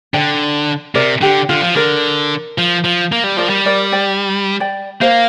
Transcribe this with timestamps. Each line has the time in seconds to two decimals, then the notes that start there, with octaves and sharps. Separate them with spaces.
0.13 D3 D5 G5
0.95 C3 A#4 D5
1.21 D3 G4
1.49 D3 F4
1.61 F3
1.75 D3 A#4
2.58 F3
2.84 F3
3.12 A#3
3.24 G3
3.37 F3 A#4 D5
3.50 G3
3.65 A#4 D5
3.92 D5 G5
4.60 D5 G5
5.01 A#3 C5 F5